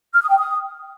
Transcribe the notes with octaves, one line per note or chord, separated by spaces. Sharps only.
F6
D#6
G5
D#6